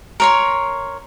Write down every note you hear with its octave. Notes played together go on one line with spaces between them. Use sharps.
A#4 C#5 C6